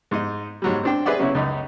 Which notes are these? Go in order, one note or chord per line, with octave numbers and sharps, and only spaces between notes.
G#2 D#4 D#5
G#2 F#3 G3
C4 D4 G5
G#4 B4 C5 D5 E5 F#5
C#3 F#3 C#4 E4 F#4
C#2 F#2 D#4